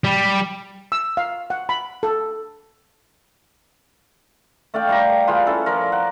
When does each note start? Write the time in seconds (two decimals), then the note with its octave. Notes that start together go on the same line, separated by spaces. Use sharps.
0.04 G3
0.92 E6
1.17 F5
1.50 F#5
1.69 B5
2.03 A4
4.74 A3 D5 F5 G5
4.89 G3 G4 A#5
5.27 F4 G#4 B4 D5
5.46 C#4 E4 A4
5.66 F3 A#4 D5
5.92 F#5